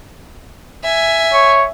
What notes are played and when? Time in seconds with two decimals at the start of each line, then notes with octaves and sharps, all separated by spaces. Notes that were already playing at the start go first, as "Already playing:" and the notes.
0.83 E5 G#5
1.33 C#5